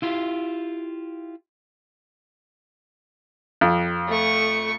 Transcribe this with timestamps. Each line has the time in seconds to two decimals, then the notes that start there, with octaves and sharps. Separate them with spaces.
0.02 E4 F4 G4
3.61 F2
4.08 A3 C#6